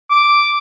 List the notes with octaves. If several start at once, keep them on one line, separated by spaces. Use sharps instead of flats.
D6